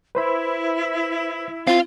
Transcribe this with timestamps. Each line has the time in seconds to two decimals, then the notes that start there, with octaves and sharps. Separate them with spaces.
0.15 E4 B4 C5 B5
1.67 C4 F4 F5